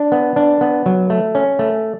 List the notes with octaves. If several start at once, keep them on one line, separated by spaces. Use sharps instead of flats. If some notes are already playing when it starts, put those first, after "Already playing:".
Already playing: D4
B3
D4
B3
F#3
A3
C#4
A3